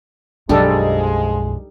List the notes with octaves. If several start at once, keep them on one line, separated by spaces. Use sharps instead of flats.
B1 F#2 F3 G3 G#3 D4 D#4 A4